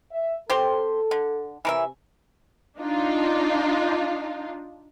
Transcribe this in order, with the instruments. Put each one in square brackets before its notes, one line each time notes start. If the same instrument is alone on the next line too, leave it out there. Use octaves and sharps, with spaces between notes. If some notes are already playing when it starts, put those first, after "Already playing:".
[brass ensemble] E5
[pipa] C4 G4 C5 [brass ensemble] A4
[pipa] D3
[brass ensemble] C3 G#5 [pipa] E3 A#4 E5
[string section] D4 D#4 F4